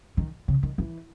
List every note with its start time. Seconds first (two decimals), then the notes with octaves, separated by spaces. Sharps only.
0.17 D#3
0.48 C#3
0.63 D#3
0.78 E3